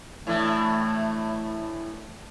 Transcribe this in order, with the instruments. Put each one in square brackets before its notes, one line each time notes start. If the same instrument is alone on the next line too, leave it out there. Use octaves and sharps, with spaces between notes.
[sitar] A2 E3 D4 [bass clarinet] A3